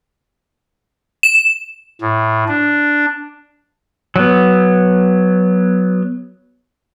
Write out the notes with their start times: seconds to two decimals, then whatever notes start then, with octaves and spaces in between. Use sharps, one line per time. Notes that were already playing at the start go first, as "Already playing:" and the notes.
1.23 E7
2.01 A2
2.48 D4
4.16 F#3 B3